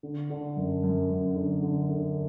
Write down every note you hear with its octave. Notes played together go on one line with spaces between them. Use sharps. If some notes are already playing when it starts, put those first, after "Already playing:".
D3
D3
F#2
F#2
F#2
D3
D3
D3